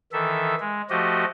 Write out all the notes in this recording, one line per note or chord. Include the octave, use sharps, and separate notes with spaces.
D#3 E3 A4 E5
G#3
F3 A3 F#4 G4 D#5